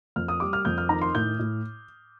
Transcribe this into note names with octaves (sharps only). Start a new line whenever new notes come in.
F2 F6
D#6
G3 D6
F6
F2 G6
F6
D#3 A#5
C6
A2 G6
A2